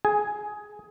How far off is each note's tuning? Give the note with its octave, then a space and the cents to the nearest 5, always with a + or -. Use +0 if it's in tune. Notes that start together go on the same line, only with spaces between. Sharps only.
G#4 +10 G#5 +0